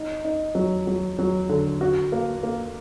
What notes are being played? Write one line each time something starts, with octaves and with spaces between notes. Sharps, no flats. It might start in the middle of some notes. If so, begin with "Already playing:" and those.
Already playing: D#4
D#4
F#3
F#3
F#3
D3
F#4
A#3
A#3